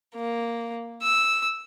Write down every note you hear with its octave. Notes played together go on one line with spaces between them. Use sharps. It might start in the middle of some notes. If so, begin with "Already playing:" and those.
A#3
E6